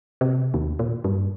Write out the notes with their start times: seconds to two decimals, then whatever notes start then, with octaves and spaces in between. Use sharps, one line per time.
0.21 C3
0.54 D#2
0.79 A#2
1.04 G2